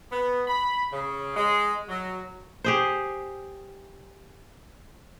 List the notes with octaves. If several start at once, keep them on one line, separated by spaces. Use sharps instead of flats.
B3
B5
C#3
G#3
F#3
G4 G#4 C5